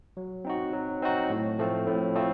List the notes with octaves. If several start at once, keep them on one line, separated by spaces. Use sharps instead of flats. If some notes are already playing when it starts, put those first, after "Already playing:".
F#3
C4 D#4 F#4
F#3
C4 D#4 F#4
A2
F3 A3 C4
A2
F3 A3 C4